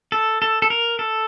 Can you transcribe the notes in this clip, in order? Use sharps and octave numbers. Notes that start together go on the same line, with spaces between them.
A4
A4
A4
A#4
A4